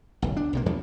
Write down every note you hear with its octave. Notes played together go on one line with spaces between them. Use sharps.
D1 B1
D4
B1 C3 A#3
E2 E3 F3